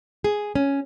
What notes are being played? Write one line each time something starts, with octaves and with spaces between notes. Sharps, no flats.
G#4
C#4